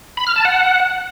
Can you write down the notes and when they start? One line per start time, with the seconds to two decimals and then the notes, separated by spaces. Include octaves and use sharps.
0.17 B5
0.27 F6
0.36 A5
0.45 F#5